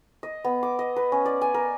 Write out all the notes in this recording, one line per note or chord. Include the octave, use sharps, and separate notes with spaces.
D#5
B3
D6
D#5
B4
C#4
D5
G#5
A#4